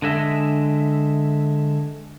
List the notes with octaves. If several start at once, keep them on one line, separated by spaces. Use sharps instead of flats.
D3 G#3 E5